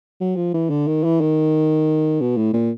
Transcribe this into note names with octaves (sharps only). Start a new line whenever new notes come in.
F#3
F3
E3
D3
D#3
E3
D#3
B2
A2
A#2